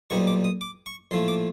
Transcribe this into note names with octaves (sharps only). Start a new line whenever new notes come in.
B1 A#2 G3 C4 D#4 C#6
D6
D#6
D6
C#6
A#1 A2 F3 A3 C6
D6